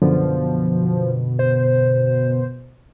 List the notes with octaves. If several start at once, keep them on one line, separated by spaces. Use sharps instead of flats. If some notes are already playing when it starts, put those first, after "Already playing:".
F#2 B2 D3 F3
C5